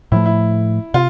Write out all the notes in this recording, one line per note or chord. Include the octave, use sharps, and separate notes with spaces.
A2 F3 A3 E4
E4
C3 F4